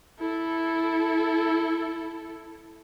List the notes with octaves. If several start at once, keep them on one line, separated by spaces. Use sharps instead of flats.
E4 A4